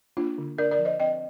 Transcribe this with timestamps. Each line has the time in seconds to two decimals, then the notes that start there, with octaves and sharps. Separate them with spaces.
0.17 A#3 D4 F4
0.38 D3
0.58 D4 A#4 D5
0.71 A#4 D5
0.79 F3
0.85 C5 D#5
0.99 C4 D#5 G5